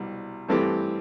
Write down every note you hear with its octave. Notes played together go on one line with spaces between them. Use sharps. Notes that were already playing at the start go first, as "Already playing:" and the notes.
Already playing: C2 B2 G3
G2 E3 A3 C4 G4